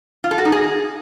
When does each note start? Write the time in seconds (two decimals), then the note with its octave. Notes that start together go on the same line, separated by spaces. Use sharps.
0.24 F4
0.31 A4
0.38 F#4
0.45 D#4
0.52 G#4